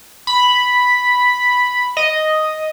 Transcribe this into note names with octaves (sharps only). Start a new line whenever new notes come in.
B5
D#5